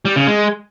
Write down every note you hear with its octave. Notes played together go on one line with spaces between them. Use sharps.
G3
C#3
G#3